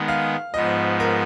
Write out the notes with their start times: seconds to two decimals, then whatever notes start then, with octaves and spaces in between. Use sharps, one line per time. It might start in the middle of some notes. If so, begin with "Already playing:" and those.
Already playing: D#3 G#3 B3
0.08 F5
0.54 G#2 F3 B3 D#5
1.00 A#4